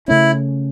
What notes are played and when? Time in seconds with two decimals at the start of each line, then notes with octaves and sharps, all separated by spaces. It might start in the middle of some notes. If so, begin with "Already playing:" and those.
0.08 C#3 A3 C#4 E4